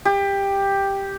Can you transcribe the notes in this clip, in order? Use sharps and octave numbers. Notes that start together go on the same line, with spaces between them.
G4